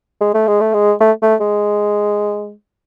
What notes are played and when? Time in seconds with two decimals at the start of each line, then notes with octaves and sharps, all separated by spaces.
0.21 G#3
0.34 A3
0.47 G#3
0.61 A3
0.74 G#3
1.00 A3
1.22 A3
1.41 G#3